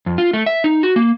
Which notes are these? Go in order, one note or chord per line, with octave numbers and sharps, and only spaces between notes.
F2
F4
A3
E5
D#4
F#4
A#3